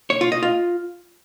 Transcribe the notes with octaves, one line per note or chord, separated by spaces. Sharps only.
C#5
F4
D#5
F4